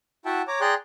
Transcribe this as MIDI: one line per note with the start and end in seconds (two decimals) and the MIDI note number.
0.25 0.42 64
0.25 0.42 66
0.25 0.42 76
0.25 0.42 78
0.25 0.42 79
0.25 0.42 81
0.48 0.61 73
0.48 0.61 82
0.48 0.61 86
0.61 0.74 68
0.61 0.74 74
0.61 0.74 79
0.61 0.74 82
0.61 0.74 84
0.61 0.74 90